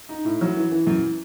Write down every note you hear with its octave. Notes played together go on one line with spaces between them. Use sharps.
D#4
A2
F#3
E3
E3
F#2